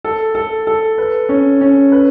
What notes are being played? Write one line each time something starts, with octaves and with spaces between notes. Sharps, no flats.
A4
A4
A4
B4
C#4
C#4
B4